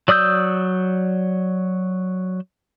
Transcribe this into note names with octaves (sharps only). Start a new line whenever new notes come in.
F#3 D5 D#6 E6 G6